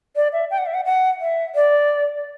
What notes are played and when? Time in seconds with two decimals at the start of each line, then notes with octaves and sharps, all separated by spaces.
0.16 D5
0.33 E5
0.51 G5
0.58 F#5
0.66 E5
0.74 F#5
0.85 F#5
1.21 E5
1.55 D5